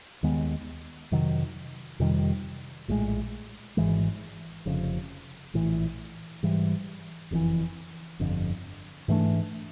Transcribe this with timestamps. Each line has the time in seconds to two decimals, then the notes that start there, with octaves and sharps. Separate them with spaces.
0.23 D#2 D#3 G#3 B3
1.11 F2 C3 D#3 F#3
2.00 F2 C3 D#3 G3
2.88 A#1 A2 E3 G#3
3.77 G#1 G#2 E3 G#3
4.66 F1 F2 C#3
5.54 A#1 A2 E3
6.43 G#2 E3 G3
7.31 F#1 F2 C#3 E3
8.20 G1 F2 D3
9.08 G#2 E3 A3 D4